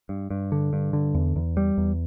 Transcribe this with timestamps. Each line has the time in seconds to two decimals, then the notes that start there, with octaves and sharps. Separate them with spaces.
0.09 G2
0.30 G2
0.52 D3
0.73 G2
0.93 D3
1.15 E2
1.36 E2
1.57 G3
1.77 E2